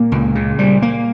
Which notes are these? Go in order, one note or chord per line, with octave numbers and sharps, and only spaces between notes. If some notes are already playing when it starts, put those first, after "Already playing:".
Already playing: A#2 A#3
C#2
C#3
G3
A#3